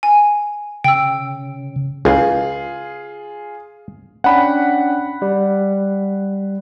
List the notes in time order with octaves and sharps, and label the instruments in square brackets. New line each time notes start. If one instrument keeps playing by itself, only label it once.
[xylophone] G#5
[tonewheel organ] C#3 [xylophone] G5 E6
[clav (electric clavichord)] C#2 [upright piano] F4 G#4
[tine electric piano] C#4 D4 G5 [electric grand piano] F#5 B5
[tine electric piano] G3